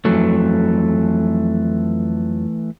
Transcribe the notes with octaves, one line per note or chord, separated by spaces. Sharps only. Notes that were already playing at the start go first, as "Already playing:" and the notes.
F2 E3 F#3 A3